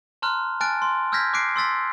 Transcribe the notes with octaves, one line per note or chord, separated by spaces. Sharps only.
A5 A#5 C6 F6 F#6
G#5 A5 F6 F#6 A6 D7
C6
E6 F6 G6 G#6 A#6 B6
D6 F#6 B6 C7 D7
C6 E6 A6 B6